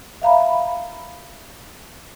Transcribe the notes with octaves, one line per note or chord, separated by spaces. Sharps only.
E5 F5 A#5 B5